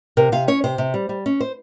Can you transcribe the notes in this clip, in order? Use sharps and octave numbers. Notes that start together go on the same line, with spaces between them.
C3 A#4
C3 F5
C#4 C#5
C3 C5
C3
G3
G3
C#4
C5